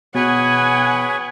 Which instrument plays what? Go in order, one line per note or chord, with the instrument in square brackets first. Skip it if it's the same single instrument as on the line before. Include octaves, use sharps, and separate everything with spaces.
[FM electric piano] B2 [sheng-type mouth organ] G#4 B4 C#5 [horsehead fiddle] F#5 G#5